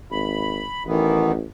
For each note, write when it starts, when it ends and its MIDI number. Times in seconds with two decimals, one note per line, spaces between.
0.11 0.62 32
0.11 0.83 83
0.87 1.42 33
0.87 1.32 51
0.87 1.32 52
0.87 1.32 59